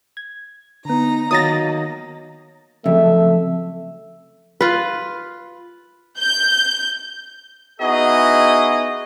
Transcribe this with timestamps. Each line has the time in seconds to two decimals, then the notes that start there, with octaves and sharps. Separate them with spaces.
0.17 G#6
0.85 D3 B3 D#4 A#5
1.31 D#3 F#3 A#3 A5 D#6 A6 A#6
2.86 F2 C#3 F3 F#3 A3 E5
4.61 F4 B4
6.19 G6
7.81 B3 D#4 E4 F#4 G#4 D#5